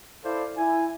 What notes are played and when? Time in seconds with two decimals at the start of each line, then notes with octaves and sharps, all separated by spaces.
0.24 E4 A4 C5 D5 F5
0.57 E4 G#5